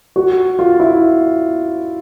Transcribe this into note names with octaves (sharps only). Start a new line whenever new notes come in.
F#4
F4
E4